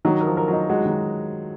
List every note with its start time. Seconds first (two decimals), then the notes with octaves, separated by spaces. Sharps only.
0.05 D#3 F#3
0.21 A#4
0.27 F3
0.37 A#4
0.48 F#3 D#4
0.69 G#3 F#4
0.85 D#3